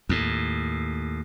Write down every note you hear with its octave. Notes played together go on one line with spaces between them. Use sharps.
D#2 A2